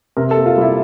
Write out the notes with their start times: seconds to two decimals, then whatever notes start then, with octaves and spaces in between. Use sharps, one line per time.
0.17 C3 A#4
0.31 A4
0.37 A#3
0.46 F4
0.57 G3 E4